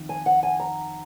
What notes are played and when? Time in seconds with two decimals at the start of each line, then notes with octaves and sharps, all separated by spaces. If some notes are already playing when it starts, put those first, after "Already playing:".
Already playing: F2 D#3
0.09 G#5
0.26 F#5
0.43 G#5
0.60 A#5